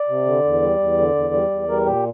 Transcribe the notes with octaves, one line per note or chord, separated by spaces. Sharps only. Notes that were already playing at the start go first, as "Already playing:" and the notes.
Already playing: D5
C3
D3
E2
G3
E2
D3
E2
G3
E2
G3 A#4
A#2 G4